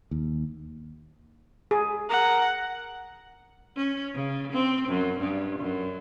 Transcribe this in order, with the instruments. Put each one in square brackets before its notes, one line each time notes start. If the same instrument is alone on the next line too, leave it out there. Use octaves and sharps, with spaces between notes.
[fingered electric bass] D#2
[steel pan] G#4
[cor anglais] A#4 [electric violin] F#5
[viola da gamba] C#4
C#3
C4
F#2
G2
F#2